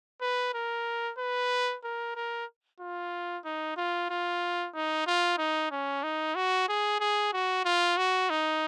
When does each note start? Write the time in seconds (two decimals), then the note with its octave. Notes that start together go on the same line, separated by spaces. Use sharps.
0.21 B4
0.54 A#4
1.18 B4
1.84 A#4
2.16 A#4
2.80 F4
3.45 D#4
3.77 F4
4.10 F4
4.75 D#4
5.07 F4
5.38 D#4
5.71 C#4
6.03 D#4
6.35 F#4
6.68 G#4
7.00 G#4
7.33 F#4
7.65 F4
7.97 F#4
8.30 D#4